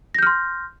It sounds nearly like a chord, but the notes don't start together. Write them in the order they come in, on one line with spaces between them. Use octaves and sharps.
A#6 G6 F6 C6